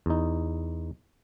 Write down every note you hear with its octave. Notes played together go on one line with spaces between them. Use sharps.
E2 D#4